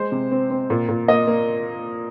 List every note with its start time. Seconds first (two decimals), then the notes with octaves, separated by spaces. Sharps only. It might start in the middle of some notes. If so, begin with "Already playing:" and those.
Already playing: G#3 C5
0.12 C3
0.32 C4
0.50 C4
0.70 A#2
0.89 A#2
1.08 A#3 D#5
1.27 A#3